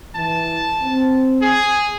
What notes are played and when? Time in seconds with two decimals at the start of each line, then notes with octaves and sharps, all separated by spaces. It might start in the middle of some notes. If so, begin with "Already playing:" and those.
0.15 E3 A5
0.82 C4
1.42 G#4